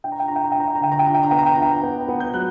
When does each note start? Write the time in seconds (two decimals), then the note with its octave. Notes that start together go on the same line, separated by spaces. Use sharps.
0.04 D4 G5
0.12 A#5
0.20 G5
0.28 D4 A#5
0.36 G5
0.44 A#5
0.52 G5
0.55 D4 A#5
0.68 G5
0.75 A#5
0.81 D3 G5
0.92 A#5
0.99 G5
1.06 D4 A#5
1.15 G5
1.23 A#5
1.31 B3 G5
1.38 A#5
1.46 G5
1.54 A#5
1.58 D4 G5
1.83 B3
2.09 B3
2.20 G6
2.33 F#3 F#6